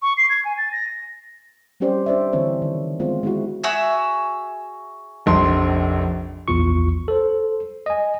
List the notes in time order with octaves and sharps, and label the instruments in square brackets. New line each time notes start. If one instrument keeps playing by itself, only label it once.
[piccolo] C#6
C7
G#6
G#5
A6
A#6
[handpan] G3 C4 C#4 G4 C5 D5
D4 C5 D5 E5
D3 E3 C4 C#5
D#3
G#3 B3 C4 F4
G#3 E4 F#4
[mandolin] F#4 G#4 E5
[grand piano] F1 A#1 C6
[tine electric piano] A#1 E2 F4 C#6
A4 C5
D#5 G#5